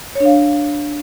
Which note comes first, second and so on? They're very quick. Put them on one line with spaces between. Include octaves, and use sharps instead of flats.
C#5 D4 F5